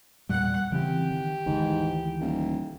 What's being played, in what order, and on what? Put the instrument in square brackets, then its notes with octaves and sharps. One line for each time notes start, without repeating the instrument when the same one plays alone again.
[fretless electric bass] E2 A#2 G3 [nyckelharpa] F#5
[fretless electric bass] C#3 E3 C4 [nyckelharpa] G4
[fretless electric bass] D#3
[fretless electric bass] D2 D#3 E3 [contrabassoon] G#2
[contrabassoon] D#1